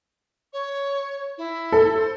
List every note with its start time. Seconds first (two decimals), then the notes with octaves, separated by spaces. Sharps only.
0.53 C#5
1.38 E4
1.72 A4
1.96 C5